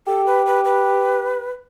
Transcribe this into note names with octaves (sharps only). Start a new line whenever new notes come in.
G4 A4
B4
B4
B4